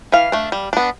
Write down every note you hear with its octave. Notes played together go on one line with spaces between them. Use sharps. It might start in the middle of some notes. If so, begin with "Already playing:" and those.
E3 F5
A3 D4
G3
B3 D4